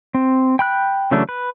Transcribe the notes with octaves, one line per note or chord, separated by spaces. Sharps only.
C4
G5 B5 F#6
C#3 E3 F#3 A3 D4
B4